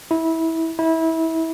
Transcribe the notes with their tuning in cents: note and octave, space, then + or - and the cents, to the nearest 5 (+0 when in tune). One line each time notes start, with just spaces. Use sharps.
E4 -20
E4 -25